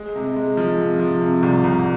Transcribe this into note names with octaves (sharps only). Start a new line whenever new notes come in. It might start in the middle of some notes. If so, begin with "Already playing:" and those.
Already playing: G#3
C3
G#3
F3
C3
F3
C3
C2
C2